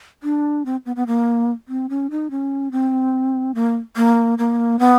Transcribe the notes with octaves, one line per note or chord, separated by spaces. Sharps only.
D4
C4
B3
B3
A#3
C4
C#4
D#4
C#4
C4
A#3
A#3
A#3
B3